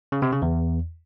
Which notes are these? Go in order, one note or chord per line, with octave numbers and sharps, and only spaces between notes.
C#3
C3
C#3
E2